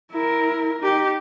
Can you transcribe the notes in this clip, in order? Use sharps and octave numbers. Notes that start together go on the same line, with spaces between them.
E4 A#4
D#4 G4